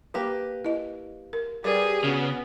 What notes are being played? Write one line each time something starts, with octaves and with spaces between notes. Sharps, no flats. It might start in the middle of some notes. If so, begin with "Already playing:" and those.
A#3 G4 B4
E4 D#5
A#4
G3 G4 G#4 A#4 B4 D5
C#3 B3 F#4